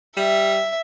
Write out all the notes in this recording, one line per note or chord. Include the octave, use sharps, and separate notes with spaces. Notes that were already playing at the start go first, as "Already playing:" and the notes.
G3 E5